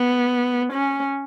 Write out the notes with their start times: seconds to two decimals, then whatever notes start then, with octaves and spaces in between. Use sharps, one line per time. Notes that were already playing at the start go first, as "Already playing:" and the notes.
Already playing: B3
0.73 C#4